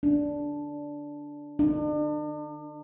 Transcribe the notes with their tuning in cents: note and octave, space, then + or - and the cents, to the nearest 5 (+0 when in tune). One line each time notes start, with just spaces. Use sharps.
D4 -5
D4 +40